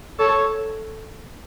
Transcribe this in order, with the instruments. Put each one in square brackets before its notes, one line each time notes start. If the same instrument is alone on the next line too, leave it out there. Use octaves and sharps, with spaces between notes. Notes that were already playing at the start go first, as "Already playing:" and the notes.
[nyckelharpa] A4 [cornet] C#5